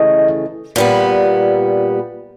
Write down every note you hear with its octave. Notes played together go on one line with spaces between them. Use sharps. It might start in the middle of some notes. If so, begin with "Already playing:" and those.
Already playing: C#3 E3 A3 D#5
A#2 G3 B3